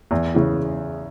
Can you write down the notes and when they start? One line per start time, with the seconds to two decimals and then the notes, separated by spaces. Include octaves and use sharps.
0.11 E2
0.34 C#3 E3